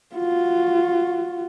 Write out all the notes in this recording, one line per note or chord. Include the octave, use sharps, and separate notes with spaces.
F4 F#4